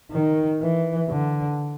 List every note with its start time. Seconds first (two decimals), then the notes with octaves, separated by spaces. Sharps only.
0.11 D#3
0.61 E3
1.09 D3